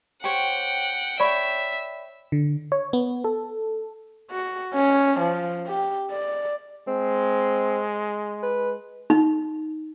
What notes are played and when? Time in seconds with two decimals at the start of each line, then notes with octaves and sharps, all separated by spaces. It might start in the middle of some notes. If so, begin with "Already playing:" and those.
0.24 G4 C5 C#5 F#5 G5
1.20 C#5 D5 E5 G5 B5
2.32 D3
2.72 C#5
2.93 B3
3.24 A4
4.31 F#4
4.74 C#4
5.20 F3
5.67 G4
6.11 D5
6.88 G#3 C4
8.43 B4
9.10 D#4